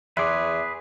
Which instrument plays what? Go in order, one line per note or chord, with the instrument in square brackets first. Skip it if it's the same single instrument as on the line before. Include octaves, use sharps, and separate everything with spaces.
[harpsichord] E2 [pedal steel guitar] G#4 B4 [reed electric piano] E5 C6 D6